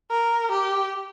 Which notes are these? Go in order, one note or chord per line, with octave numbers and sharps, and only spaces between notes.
A#4
G4